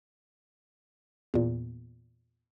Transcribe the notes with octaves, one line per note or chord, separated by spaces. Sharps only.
E2 A#2